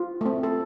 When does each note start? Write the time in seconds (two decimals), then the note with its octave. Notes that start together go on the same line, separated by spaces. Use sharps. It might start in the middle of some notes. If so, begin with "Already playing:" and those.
Already playing: F4
0.21 A3 C4
0.43 A4